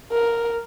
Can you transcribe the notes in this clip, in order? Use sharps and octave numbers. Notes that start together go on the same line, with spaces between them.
A#4